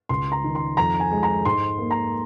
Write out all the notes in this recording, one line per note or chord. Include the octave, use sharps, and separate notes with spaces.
C#2 C6
A#5
D#3
C6
F2 A#5
G#5
G#3
A#5
G#2 C6
A#3
A#5